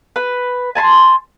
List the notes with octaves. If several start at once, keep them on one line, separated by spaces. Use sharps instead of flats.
B4
G#5 A5 B5 C6